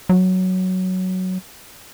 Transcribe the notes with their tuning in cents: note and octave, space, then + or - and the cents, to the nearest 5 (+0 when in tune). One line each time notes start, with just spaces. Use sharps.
F#3 +5